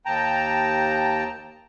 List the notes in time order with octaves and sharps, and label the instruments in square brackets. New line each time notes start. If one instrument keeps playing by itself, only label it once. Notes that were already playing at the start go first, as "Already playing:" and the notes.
[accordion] D#2 G5 A5 A#5